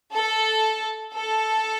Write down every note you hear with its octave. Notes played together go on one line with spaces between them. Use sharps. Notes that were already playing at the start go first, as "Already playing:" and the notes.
A4
A4